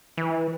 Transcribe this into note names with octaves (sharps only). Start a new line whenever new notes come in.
E3